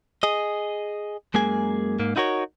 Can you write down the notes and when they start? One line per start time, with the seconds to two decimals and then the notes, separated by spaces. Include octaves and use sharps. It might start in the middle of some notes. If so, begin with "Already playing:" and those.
0.23 G#4 D#5
1.34 F#2 G#3 A#3 G#4 G#5
1.99 G#2 A#3
2.16 D#4 E4 F#4 A#4 C#5